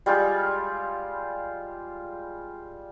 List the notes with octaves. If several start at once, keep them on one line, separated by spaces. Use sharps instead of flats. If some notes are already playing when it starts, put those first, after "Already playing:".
G3 G#3 F4 G4